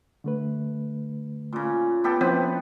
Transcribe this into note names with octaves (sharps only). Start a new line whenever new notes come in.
D3 A3 B4
A#2 C#3
B3 G4 A4
F3 C4 C#4 E4 B4